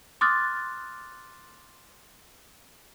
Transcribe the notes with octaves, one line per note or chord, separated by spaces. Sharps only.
C6 D6 D#6 F6 F#6 A6